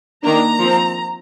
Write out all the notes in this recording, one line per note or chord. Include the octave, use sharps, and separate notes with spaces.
D#3 A#3 D4 A#5
F3 C4